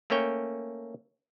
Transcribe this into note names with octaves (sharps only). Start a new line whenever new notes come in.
A3 A#3 C#4 C#5 G5